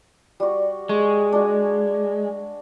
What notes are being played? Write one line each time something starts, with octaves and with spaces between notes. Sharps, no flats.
G3 F#4
G#3 C#6
D4 F#4